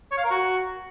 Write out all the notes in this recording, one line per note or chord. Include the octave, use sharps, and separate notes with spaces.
C#5
F5
A#4
F#4